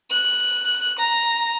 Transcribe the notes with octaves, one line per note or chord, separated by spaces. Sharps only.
F#6
A#5